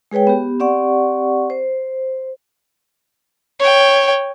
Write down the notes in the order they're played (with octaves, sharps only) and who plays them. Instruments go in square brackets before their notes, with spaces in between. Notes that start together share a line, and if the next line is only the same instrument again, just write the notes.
[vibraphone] G#3 G#4 B4 C#5 G5
B3 G4
C4 G4 D5 F#5 C#6
C5
[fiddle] C#5 G5